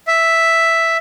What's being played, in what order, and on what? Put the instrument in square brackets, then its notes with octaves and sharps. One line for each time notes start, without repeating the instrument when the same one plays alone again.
[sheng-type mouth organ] E5